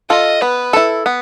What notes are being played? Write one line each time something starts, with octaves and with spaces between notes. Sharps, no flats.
F4 A4 D#5
B3 B4
E4 A4
B3